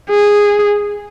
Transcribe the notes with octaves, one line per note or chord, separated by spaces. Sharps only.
G#4